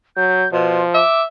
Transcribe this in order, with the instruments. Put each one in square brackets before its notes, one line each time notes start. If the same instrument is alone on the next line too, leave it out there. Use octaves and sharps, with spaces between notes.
[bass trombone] F#3 [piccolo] G6
[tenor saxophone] B2 [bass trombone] F3 [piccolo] C6
[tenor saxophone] E5 [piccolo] D6